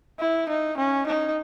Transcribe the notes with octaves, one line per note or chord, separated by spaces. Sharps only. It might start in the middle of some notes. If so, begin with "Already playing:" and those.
E4
D#4
C#4
D#4